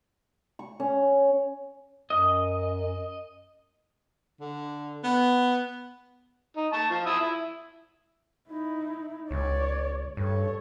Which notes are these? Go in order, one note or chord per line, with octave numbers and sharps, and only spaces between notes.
C#6
C#4
F#2 D#5
D3
B3
D#4
A5 C#6
F3
E4 D#6 E6
E4
D#4 E4
C#2 C#5 D5
G2 A4 C#5